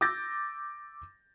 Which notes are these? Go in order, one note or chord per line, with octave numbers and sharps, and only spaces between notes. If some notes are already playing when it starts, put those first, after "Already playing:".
D6 E6 G6 A6 A#6